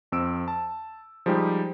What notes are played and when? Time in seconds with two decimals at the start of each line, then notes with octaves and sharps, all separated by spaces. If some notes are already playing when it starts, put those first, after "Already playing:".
0.12 F2 C4 E6 D7
0.48 A5
1.26 F3 G3 G#3 D#4 G4